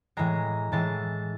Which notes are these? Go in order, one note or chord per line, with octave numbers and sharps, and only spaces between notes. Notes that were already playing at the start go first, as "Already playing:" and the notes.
A2 E3 G#3 A#5
A2 E3 G#3 A5